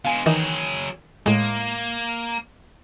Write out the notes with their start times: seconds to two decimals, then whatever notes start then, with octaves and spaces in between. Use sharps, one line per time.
0.05 B2 G#3 F5 G#5
0.26 D#3 E3 F#3 D#4 G#4
1.26 A2 G#3 A#3